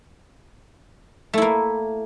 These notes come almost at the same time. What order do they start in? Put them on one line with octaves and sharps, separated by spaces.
A3 E4 A#3